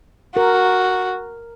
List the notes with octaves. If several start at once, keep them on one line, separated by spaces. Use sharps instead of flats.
F#4 A#4